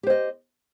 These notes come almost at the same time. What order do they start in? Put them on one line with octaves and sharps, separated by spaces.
G4 C5 D#5